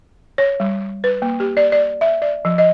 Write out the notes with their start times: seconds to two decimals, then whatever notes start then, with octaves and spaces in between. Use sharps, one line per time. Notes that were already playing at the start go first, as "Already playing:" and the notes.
0.38 C#5
0.60 G3
1.04 B4
1.22 A#3
1.40 G4
1.57 D5
1.72 D5
2.01 E5
2.22 D5
2.45 F3
2.58 D#5